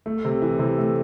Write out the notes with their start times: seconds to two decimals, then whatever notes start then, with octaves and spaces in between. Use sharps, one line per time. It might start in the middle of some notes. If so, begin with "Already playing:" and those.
0.06 A3
0.25 C3
0.42 E3
0.59 C3
0.78 A3